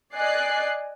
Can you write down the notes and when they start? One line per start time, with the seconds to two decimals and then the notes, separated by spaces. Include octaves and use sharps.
0.14 D5 D#5 G#5 F#6 C7